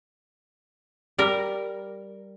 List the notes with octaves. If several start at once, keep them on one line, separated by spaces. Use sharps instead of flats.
G3 A#4